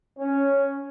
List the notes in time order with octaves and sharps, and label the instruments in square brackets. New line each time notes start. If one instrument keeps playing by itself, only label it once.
[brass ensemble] C#4 C#5